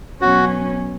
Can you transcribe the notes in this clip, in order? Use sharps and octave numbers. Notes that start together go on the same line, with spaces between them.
B2 F#3 C#4 F#4